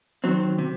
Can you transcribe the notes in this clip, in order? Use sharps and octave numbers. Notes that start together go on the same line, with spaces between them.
D#3 F#3 C4
C3